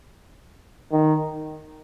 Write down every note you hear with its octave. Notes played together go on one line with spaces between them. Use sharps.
D#3